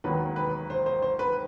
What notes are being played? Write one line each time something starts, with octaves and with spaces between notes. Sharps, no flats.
E1 D#2 D#3 F#3 B4
B4
C5
C5
C5
B4